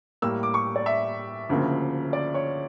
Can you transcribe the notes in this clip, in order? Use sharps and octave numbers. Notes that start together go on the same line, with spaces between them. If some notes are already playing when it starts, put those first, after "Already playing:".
A2 G3 A#3 E6
D6
C#6
D5
E5
D2 C#3 F3 A#3
D5
C#5